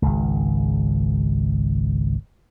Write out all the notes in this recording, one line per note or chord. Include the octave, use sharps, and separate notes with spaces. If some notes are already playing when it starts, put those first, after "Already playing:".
G#1 C#2